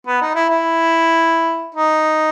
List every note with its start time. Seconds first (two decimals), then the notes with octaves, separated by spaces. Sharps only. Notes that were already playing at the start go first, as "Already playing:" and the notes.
0.07 B3
0.21 D#4
0.35 E4
0.49 E4
1.75 D#4